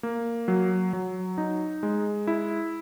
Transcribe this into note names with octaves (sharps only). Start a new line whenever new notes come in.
A#3
F#3
F#3
D#4
G#3
E4